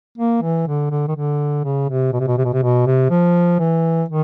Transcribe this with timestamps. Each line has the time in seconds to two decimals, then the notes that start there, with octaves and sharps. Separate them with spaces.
0.18 A#3
0.42 E3
0.67 D3
0.91 D3
1.07 D#3
1.15 D3
1.64 C#3
1.89 C3
2.13 B2
2.20 C3
2.27 B2
2.38 C3
2.45 B2
2.53 C3
2.62 B2
2.86 C3
3.10 F3
3.59 E3
4.08 D#3